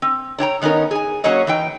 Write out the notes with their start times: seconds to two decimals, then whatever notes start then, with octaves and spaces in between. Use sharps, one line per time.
0.02 C4
0.39 D4 C#5 G5 A#5
0.61 D#3 B3 C#4 D#4 A#4
0.91 G#4 G#5
1.24 F#3 A#3 C#4 C#5 D#5
1.47 E3 D#4 G5